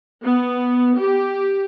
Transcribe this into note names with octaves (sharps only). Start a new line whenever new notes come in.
B3
G4